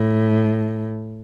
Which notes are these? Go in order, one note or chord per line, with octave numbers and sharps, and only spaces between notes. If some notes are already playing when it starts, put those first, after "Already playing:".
Already playing: A2